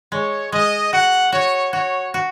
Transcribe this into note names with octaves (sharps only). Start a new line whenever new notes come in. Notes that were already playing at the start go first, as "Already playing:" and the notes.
G#3 C#5
G#3 D#5
F#4 F#5
F#4 C#5
F#4 C#5
F#4